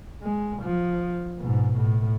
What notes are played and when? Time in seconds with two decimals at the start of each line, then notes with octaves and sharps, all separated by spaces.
0.23 G#3
0.63 F3
1.39 G#2 B2
1.77 A2